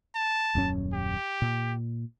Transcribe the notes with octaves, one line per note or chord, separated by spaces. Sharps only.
A5
D#1 F#2 C#4
G4
A#2